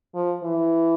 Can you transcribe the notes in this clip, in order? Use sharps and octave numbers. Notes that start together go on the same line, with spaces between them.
F3
E3